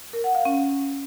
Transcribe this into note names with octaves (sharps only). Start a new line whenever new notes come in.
A#4
F#5
F5
C#4